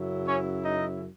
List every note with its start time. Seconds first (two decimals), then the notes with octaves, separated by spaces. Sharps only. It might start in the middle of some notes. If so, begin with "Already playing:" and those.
Already playing: F#2 C#3 F#3 E4
0.25 C#4 C#5
0.62 D#4 D#5